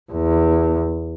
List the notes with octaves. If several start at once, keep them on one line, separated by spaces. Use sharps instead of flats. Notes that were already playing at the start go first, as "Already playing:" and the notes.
E2